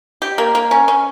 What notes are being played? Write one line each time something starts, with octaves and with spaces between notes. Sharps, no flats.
G4
A#3
A#3
C#4
C#4